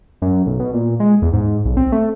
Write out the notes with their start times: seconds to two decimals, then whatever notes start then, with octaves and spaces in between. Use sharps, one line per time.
0.22 F#2
0.46 B1
0.60 B2
0.73 A#2
1.00 G#3
1.22 E2
1.33 G#2
1.65 B1
1.77 C4
1.92 A3